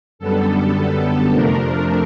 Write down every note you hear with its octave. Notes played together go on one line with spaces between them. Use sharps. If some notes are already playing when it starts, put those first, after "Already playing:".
F#2 D3 G3 B3 A4
F2 C3 F3 A3 D4 A#4